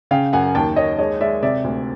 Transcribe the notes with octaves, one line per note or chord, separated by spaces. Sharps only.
C#3 F5 G5
F#2 F#5 G#5
D#2 G5 A5
D#2 C#5 D#5
G#3 C#5 D#5
G#3 D5 E5
C3 D5 E5
D2